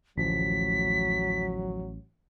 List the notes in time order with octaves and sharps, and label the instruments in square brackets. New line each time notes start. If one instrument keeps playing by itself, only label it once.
[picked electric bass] A1 [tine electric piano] D2 F3 [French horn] F#3 [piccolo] B6